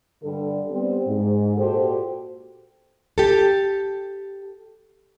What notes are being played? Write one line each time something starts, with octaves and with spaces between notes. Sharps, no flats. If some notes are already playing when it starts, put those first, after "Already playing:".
G2 D3 G3 A4
G3 B3 C4
G#2
A#2 F#4 G4 A4 C5
G4 A4